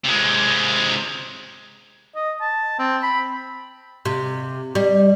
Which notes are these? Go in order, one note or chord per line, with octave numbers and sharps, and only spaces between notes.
C3 G#3
D#5
A5
C4
B5
C3
G3